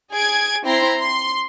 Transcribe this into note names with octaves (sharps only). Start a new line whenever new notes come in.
G#4 G#6 D7
C4 E4 A#5 C6
C6